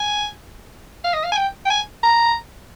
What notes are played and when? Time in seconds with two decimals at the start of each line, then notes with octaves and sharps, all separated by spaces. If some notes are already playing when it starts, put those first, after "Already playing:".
Already playing: G#5
1.04 F5
1.14 D#5
1.24 F5
1.32 G#5
1.37 G5
1.66 G5
1.70 G#5
2.03 A#5